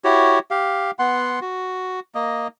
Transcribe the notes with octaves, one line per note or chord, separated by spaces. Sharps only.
E4 F#4 G4 C#5
G4 F5
B3 F#5 C6
F#4
A#3 D#5